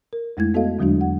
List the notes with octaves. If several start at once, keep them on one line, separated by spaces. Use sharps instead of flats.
A#4
F2 G#3 A3 E4 G#6
B3 F#4 A4 D#5 F5
E2 D3 F#3 G#3 D4 F#4
F#5